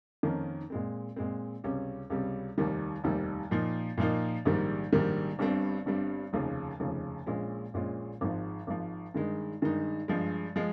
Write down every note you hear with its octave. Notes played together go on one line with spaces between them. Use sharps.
F2 D#3 A#3 C#4
A#2 G#3 C4
A#2 G#3 C4
C#2 C3 G3 C#4
C#2 C3 G3 C#4
F1 D#2 D#3 G3
F1 D#2 D#3 G3
A#2 F3 A#3 D#4
A#2 F3 A#3 D#4
A#1 G#2 D#3 G3
A#1 G#2 D#3 G3
G1 G2 G3 C4
G1 G2 G3 C4
F1 D#2 C#3 F3
F1 D#2 C#3 F3
A#1 A#2 G#3 C#4 F4
A#1 A#2 G#3 C#4 F4
G#1 G#2 F3
G#1 G#2 F3
G2 D#3 G#3 D#4
G2 D#3 G#3 D#4
G2 F3 G#3
F3 G#3